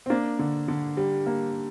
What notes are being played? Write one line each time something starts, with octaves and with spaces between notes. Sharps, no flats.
C4
A#3 D4
D3
D3
G3
A#3